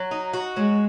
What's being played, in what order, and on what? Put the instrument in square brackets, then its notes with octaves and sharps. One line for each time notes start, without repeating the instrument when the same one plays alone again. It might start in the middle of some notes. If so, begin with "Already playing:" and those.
Already playing: [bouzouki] F#3
D#4
F#4
[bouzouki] F#3 [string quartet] G#3